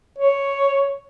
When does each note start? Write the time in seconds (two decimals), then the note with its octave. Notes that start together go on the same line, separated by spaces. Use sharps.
0.19 C#5